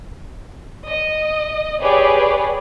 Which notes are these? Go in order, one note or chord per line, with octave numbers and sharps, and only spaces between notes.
D#5
G4 G#4 B4 C#5 D5